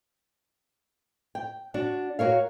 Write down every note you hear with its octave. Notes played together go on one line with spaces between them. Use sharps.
G5
D4 F#4
F#4 A#4 C#5 F5